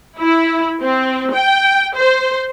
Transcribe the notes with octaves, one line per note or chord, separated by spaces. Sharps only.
E4
C4
G5
C5